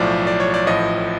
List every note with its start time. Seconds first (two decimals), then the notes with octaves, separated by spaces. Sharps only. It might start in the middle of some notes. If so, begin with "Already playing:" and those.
Already playing: B1 A2 F3 D5
0.27 D5
0.40 C#5
0.54 D5
0.67 A1 A2 F3 D#5